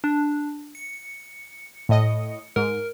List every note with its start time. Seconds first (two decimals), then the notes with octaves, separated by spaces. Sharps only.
0.04 D4
0.75 C#7
1.89 A2 D#5
2.56 G#2 A#4